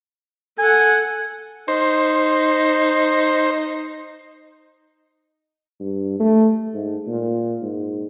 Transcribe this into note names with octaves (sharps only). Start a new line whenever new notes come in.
A4 F#5 G#5
D#4 C5
G2
A3
G#2
A#2
G#2